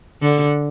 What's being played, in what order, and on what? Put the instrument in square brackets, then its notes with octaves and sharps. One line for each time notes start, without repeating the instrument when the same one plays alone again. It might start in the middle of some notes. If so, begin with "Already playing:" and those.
[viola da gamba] D3